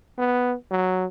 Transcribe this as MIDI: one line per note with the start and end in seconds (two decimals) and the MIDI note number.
0.18 0.54 59
0.71 1.05 54